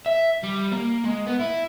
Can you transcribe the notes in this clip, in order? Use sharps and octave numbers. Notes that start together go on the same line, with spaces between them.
E5
G3
A#3
G#3
B3
E4